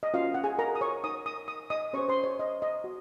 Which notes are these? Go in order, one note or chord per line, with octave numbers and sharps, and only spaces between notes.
D#5
C#4 F4 F#4 C#5 F5
F#5
G#4 G#5
A#4 A#5
D#6
C#5 C#6
D#4 A#4 C#5 D#6
D#6
D#6
D#5 D#6
C#4 G#4 C5 C#5 C#6
C5 C6
C#5
D#5
D#5
F#4